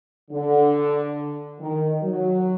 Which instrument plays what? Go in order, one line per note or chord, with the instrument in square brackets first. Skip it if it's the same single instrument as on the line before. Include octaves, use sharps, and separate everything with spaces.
[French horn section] D3
D#3
F#3